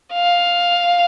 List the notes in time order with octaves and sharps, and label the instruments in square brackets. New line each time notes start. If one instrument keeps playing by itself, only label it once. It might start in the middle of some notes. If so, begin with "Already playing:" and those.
[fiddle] F5